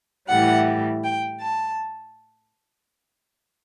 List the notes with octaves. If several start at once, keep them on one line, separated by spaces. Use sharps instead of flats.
A2 E3 G3 F#5
G5
A5